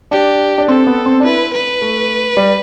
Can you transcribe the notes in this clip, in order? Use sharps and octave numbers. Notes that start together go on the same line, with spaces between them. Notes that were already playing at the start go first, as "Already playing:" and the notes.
D4 G4
D4
C4 A4
B3
C4
D4
E4 B4
B4
A3
G3